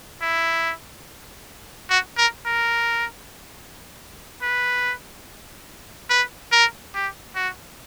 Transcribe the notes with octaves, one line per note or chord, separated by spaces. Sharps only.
E4
F#4
A#4
A#4
B4
B4
A#4
G4
F#4